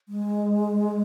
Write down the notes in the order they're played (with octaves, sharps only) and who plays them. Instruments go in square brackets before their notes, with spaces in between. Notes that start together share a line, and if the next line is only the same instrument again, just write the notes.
[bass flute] G#3